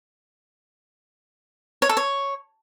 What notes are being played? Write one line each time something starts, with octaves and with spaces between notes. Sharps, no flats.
C#5
A4
C#5